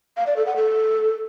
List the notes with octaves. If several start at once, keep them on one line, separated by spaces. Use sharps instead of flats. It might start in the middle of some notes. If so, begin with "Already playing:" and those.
F5
D5
A4
F#5
A4